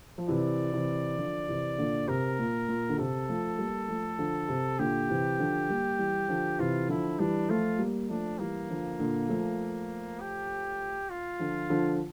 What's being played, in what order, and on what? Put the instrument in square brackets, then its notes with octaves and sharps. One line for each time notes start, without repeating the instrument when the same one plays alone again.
[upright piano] F3
[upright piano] C3 E3 [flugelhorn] D5
[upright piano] C3 E3
D3 F3
C3 E3
A#2 D3
[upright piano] C3 [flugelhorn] A#4
[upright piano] A#2
A#2
D3
[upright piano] C3 [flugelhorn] A4
[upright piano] F3 A3
G3 A#3
F3 A3
D3 F3
C3
[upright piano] A#2 D3 [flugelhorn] G4
[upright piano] C3 E3
D3 F3
G3 A#3
E3 G3
D3 F3
[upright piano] C3 E3 [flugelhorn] F4
[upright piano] D3 F3 [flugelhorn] E4
[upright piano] E3 G3 [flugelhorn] D4
[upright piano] F3 A3 [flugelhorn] F4
[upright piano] G3 A#3
[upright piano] F3 A3 [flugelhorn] D4
[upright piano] E3 G3 [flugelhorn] A#3
[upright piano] D3 F3
A#2 D3
F3 A3
[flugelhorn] G4
F4
[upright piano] D3 F3
D3 F3